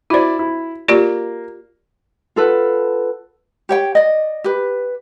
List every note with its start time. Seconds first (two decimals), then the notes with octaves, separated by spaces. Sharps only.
0.10 E4 F#4 C5 D5
0.39 E4
0.88 A#3 F4 G4 D5
2.36 F4 A4 B4 F#5
3.69 G4 C#5 G5
3.95 D5 D#5
4.44 G4 B4